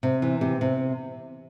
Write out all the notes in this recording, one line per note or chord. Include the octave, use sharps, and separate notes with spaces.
C3
E3
C3
C3